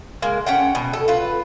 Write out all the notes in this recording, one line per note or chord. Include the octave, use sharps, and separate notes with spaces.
G#3 A#3
C#4 F#5 G5
B2
A4
F4 B4